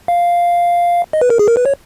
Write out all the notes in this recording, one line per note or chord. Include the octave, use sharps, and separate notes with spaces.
F5
D#5
B4
A#4
G#4
A#4
B4
C#5